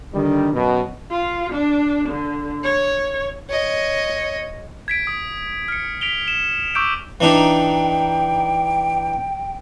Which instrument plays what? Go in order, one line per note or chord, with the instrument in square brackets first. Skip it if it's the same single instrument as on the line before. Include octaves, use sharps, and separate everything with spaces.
[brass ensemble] D3 D#3 G3
F#2 B2
[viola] F4
D4
D3
C#5
[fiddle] C#5 D#5
[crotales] G#6 B6 D7
D#6
F6 C#7
B6 D7 F7 G7
E7
C#6 D6 E6 G6 D7
[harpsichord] E3 D4 D#4 [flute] G5